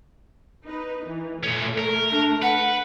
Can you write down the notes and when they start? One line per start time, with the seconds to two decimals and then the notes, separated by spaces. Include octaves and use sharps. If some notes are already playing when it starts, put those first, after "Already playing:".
0.68 D#4 B4
1.06 E3
1.43 A#2 A3 C#4
1.78 A#4
2.11 D4
2.42 B4 F#5